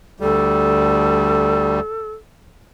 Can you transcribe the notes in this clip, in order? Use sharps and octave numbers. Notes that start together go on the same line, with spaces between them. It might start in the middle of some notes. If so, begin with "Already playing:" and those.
D2 G3 A4